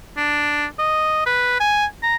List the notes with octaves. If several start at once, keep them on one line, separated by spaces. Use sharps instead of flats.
D4
D#5
B4
G#5
A#5